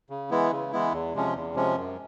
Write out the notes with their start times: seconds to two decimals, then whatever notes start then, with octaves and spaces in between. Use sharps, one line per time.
0.10 C#3
0.31 E3 G#3 B3 E4
0.51 C#3
0.72 E3 G#3 B3 E4
0.93 E2
1.14 C3 F3 G#3 C#4
1.35 E2
1.55 C3 F3 G#3 C#4
1.76 F#2